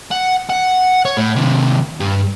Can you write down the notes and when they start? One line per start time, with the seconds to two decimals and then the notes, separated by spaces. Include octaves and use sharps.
0.12 F#5
0.49 F#5
1.05 C#5
1.17 A2
1.36 D#2 C3
2.00 G2